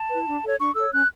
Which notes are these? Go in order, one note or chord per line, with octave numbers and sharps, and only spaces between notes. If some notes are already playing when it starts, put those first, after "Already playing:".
Already playing: A5
E4 B4
D4
A4 C#5
D4 C#6
A4 C#5 E6
C#4 F#6